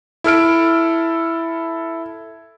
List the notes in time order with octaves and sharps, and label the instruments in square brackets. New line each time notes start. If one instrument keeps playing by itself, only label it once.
[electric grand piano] E4 A4 F6 D7